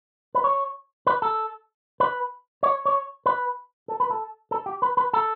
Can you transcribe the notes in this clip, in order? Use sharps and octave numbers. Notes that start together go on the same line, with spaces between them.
B4
C#5
B4
A4
B4
C#5
C#5
B4
A4
B4
A4
A4
G4
B4
B4
A4